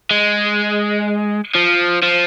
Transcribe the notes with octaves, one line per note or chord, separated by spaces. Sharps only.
G#3
F3
F3